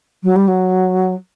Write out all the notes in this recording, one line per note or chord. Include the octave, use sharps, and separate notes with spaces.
F#3
G3
F#3